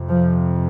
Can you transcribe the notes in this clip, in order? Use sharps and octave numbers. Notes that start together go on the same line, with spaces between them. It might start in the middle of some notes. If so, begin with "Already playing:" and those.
Already playing: F2 C3
F3